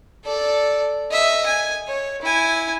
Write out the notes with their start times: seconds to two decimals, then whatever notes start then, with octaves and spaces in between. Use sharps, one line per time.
0.24 A4 D5
1.11 D#5 E5
1.46 G#5
1.88 C#5
2.22 E4 G#5